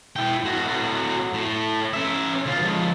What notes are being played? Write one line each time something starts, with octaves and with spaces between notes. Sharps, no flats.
E4 G5
A2 F#4
A2
C#4 E5
D3 F4
F3 G#3